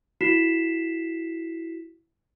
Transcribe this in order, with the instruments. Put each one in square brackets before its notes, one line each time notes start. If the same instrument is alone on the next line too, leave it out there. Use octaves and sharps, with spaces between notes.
[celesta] E4 F#4 B6 C7 E7